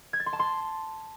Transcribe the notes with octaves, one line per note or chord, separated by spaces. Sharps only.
G#6
A6
C6
A5
C6